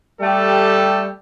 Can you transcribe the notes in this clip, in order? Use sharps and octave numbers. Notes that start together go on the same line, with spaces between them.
G3 A3 G4 A4